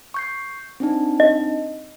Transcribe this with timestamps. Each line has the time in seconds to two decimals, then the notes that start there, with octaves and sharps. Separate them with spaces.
0.14 C#6 G6 C7
0.80 C4 D4 D#4
1.20 D#5